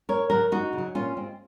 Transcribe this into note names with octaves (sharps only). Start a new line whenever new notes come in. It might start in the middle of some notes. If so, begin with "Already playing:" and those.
F#2 A#4 C#5
C#3 F#3 F#4 A#4
F#2 D#4 F#4
C#3
F#3
A#2 C#4 F4
G#3 C4